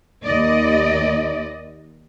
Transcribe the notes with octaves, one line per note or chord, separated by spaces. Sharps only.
D#2 D5 D#5